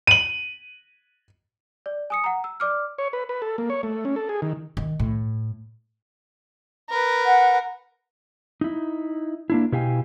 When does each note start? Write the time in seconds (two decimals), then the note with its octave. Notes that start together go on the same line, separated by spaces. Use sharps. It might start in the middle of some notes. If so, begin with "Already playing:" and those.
0.07 D#7 F#7
1.86 D5
2.10 G#5 D#6 C#7
2.24 F#5 A#5
2.44 E6
2.60 D5 D6 F6
2.98 C#5
3.13 B4
3.29 B4
3.42 A4
3.58 A#3
3.70 C#5
3.83 A3
4.05 C#4
4.16 A4
4.29 G#4
4.42 D#3
4.77 D#3
5.00 A2
6.90 A#4 B4
7.26 F#5
8.61 D#4 E4
9.50 A#3 D4 E4
9.72 B2 E4 G4 F5 G5 G#5